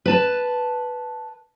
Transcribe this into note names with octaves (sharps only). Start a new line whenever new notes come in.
B4 A5